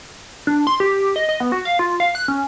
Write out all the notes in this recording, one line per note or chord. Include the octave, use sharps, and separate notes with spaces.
D4
C6
G4
D#5
D#5
B3
F#4
F5
F4
F5
F#6
C#4